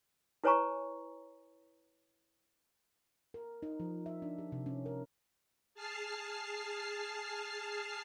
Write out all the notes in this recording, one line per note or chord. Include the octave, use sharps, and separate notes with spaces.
E4 B4 C#5 G#5 A#5 C#6
A#4
D#4
F3
E5
D4
G4
C3
C#4
A#4
G#4 A5 F6 C7